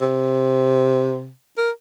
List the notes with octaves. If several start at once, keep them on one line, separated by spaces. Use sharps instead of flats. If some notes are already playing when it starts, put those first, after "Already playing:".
C3
A#4